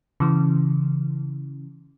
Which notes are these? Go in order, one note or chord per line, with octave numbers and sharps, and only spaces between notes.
C#3 E3